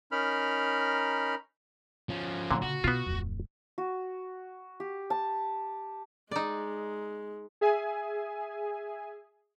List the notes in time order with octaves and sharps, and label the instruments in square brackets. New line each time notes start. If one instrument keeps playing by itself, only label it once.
[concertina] C#4 D#4 A#4 B5 F6
[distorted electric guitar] F3 C#4
[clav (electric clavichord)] A#2 D3 [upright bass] C4
[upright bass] C#3 [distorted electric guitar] F#4
[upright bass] B2 [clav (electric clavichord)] B3 F4
[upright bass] D1 F2
[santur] F#4
G4
A5
[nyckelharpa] G#3 [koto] D#4 D5
[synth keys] G#4 E5 G#5